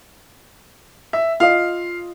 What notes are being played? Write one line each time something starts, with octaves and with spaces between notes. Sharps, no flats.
E5
F4 D#5 F5